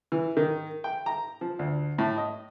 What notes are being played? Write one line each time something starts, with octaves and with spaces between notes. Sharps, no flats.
E3
D#3
G5
A#5
F3
D2
A2
D#5